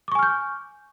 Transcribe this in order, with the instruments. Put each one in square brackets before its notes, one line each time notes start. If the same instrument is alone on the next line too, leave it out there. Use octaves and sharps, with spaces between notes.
[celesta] D6
C#6
G#5
F6
G6